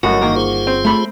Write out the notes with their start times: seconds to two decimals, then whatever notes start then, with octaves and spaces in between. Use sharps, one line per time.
0.03 G1 F#2 A2 F#4 A#4 D#5
0.21 D#3 A#3
0.36 F4 G#4 C5
0.67 C4
0.85 A3 B5